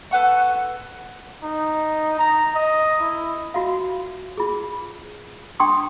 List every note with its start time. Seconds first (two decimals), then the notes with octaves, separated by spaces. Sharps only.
0.11 A4 B4 F#5 C#6
1.43 D#4
2.19 A#5
2.55 D#5
3.01 E4
3.54 F4 F#4 E5 F5
4.37 F4 G#4
5.60 D4 G5 C6 C#6 D#6